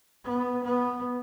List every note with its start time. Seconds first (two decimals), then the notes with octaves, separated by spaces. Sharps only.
0.24 B3
0.63 B3